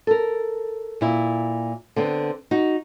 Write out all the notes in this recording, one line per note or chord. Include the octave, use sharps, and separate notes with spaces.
A4 A#4
A#2 E4
D3 B3 C4
D#4 F#4